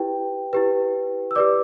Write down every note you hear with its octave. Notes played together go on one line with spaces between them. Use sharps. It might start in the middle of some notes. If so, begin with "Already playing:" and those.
Already playing: E4 G4 B4 G5
E4 G4 B4
E6
G4 B4 D5 D6